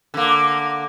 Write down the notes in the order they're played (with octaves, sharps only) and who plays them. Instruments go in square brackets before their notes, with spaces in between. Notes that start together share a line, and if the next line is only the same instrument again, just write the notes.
[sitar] D3 A#3